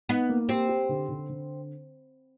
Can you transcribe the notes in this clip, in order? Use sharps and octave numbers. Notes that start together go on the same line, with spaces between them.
B3 D#4
A#3
C4 G4
G4
D3
D3
D3